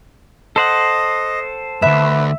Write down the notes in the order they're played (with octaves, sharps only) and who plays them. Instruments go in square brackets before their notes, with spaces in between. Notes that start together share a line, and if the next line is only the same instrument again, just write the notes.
[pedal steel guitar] A4 C5 F#5 [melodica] D#5
[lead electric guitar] D2 G2 [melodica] B4 [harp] E5